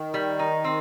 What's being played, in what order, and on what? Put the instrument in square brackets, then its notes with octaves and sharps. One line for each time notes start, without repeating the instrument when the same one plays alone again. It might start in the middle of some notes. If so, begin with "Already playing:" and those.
Already playing: [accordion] D#3
[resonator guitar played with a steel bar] G3
D#4
C4